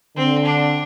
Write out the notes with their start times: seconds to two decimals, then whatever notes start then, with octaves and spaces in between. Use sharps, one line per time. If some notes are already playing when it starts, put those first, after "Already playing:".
0.16 D3 C4
0.45 D4